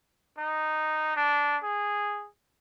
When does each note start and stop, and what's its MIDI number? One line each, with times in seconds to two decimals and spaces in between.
0.38 1.12 63
1.16 1.57 62
1.63 2.26 68